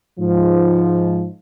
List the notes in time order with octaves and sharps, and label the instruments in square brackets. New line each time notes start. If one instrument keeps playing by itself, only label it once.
[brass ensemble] G#2 F3